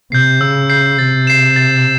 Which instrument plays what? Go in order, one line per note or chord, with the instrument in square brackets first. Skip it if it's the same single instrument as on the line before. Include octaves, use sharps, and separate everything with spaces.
[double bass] C3 [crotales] G6 C7
[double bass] C#3 [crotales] E6
[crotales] G6 C7
[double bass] C3 [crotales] A6
[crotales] C7 E7
A6